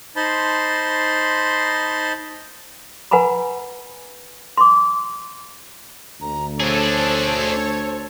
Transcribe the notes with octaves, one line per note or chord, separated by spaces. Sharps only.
D#4 C5 A5 B5 C6
B4 F#5 G#5 A#5 B5
C6 D6
D2 A#5
D4 G#4 A4 C5 C#5